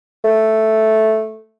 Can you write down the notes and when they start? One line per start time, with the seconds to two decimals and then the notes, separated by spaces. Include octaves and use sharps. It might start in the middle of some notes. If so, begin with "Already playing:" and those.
0.24 A3